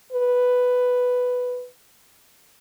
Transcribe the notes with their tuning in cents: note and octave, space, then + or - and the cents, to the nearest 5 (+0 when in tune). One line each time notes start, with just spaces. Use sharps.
B4 +5